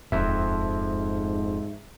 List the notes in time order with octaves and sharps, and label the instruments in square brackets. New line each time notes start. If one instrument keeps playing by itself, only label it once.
[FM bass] D#1 [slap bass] F2 [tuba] G#2 [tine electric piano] E5